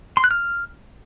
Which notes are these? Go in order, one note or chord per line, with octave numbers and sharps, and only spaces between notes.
C6
F#6
F6